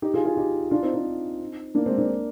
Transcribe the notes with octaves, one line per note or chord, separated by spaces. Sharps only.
D#4 G4
F4 G#4
F4 G#4
D#4 G4
D4 F4
C4 D#4
C4 D#4
A#3 D4
G#3 C4
A#3 D4